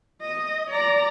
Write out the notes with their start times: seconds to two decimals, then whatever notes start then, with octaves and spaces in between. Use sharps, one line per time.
0.22 D#5
0.70 D5 A#5